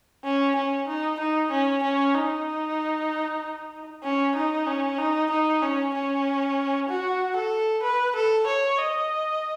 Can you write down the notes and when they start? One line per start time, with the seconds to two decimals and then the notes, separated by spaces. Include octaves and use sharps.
0.24 C#4
0.56 C#4
0.88 D#4
1.20 D#4
1.51 C#4
1.83 C#4
2.15 D#4
4.04 C#4
4.36 D#4
4.67 C#4
4.98 D#4
5.30 D#4
5.62 C#4
5.94 C#4
6.89 F#4
7.36 A4
7.83 B4
8.15 A4
8.47 C#5
8.78 D#5